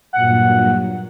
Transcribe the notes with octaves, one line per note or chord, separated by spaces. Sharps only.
G2 A#2 F#3 F#5